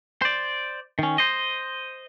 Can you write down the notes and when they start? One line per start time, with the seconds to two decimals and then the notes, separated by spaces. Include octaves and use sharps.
0.22 C5 D5
0.99 D#3 C#4
1.18 C5 D#5